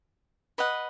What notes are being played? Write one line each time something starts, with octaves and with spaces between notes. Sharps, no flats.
B4 D#5 F#5